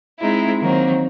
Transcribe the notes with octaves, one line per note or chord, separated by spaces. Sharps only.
G#3 C4 D#4 E4
D#3 F#3 A#3 C4